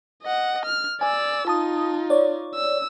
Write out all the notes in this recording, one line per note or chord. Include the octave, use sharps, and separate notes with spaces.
D#5 F#5
F6
D5 G#5 E6
D#4 F4 A5 D#6
C#5 D5
E6